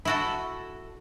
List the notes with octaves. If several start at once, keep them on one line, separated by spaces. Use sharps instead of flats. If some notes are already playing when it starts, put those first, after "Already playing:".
E4 F#4 A4